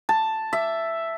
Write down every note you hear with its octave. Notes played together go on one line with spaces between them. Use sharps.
A5
E5